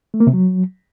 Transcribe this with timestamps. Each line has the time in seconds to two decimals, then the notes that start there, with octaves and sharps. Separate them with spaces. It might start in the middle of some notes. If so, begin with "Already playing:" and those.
0.14 A3
0.20 A#3
0.27 C3
0.33 F#3